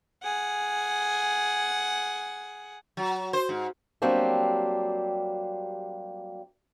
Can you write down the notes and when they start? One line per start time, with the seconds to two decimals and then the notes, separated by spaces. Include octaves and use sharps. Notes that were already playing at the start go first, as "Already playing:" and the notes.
0.23 G#4 F#5
2.97 F#3
3.33 C5
3.49 G#2
4.02 F#3 G3 A#3 C4 D4 G4